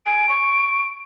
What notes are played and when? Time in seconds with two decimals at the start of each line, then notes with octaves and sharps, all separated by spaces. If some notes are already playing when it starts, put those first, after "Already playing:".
0.06 G#5 D7
0.29 C#6